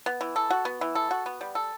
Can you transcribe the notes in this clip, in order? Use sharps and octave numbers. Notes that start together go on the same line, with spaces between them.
B3
E3
A4
F#4
B3
E3
A4
F#4
B3
G3
A4